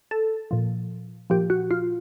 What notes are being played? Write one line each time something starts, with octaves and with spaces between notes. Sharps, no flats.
A4
A#2 F3
A#2 F3 G4
F#4
F4